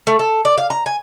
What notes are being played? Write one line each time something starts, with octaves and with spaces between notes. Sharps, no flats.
A3
A4
D5
F5
A#5
G#5